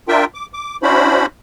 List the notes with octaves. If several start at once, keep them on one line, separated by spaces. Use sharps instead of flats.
D4 F4 A#4 E5 G5
D6
D6
C#4 D4 E4 F#4 C5 B5